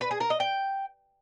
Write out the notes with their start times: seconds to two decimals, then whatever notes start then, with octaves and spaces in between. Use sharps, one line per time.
0.01 B4
0.11 G#4
0.20 A#4
0.30 D#5
0.40 G5